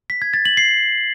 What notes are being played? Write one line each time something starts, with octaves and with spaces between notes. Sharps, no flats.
B6
G#6
A6
F#7
C7